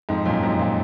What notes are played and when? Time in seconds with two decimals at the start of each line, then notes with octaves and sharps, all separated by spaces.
0.09 F2 G#2
0.26 F#2 A#2
0.43 F2 G#2
0.59 A#2